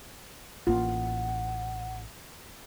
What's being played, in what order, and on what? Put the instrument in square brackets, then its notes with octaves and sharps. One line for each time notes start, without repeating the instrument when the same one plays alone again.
[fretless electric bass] A1 A#3 [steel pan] F4 [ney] F#5